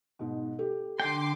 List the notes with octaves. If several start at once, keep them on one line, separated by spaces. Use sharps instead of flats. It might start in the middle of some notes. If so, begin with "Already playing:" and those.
G#2 B2
G4 A4
D3 G5 C6 D6 C7